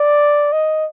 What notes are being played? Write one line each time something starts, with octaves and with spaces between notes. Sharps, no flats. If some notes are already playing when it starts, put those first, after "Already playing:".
Already playing: D5
D#5